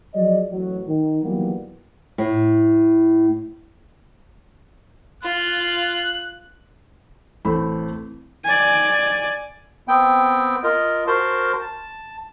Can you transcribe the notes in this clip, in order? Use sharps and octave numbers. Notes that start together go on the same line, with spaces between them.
F3 F#3 G#4 D5 D#5
A1 F#3
D#3
D#3 E3 F#3 G3 A#3 B3
A2
F4 F#6
A1 A3 C4 B5
D5 G#5
B3 C4 G5
F4 A#4 D#5
F#4 A#4 C5 A5 C6
A5